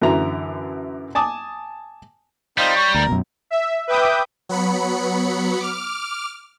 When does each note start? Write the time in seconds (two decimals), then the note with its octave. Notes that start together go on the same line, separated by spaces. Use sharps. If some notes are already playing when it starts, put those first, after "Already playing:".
0.02 F#2 D3 E3 F#3 E4 A#5
1.15 G#5 A5 D6 D#6
2.58 G3 C4 D#4 F4
2.76 C#5
2.95 D2 A#4
3.08 F#2 B2
3.50 E5
3.87 B4 E5 G5 D6 D#6 G6
4.49 F#3 B3 B5 C#7
5.60 D6 F6